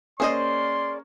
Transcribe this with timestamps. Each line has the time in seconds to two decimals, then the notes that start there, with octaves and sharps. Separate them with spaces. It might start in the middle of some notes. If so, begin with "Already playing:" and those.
0.20 A#3 C#4 G#4 C5 D5 D#5 C6